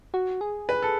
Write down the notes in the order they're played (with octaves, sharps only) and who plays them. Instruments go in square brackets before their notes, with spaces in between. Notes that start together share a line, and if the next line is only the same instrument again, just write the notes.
[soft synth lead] F#4
G#4
[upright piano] B4
A4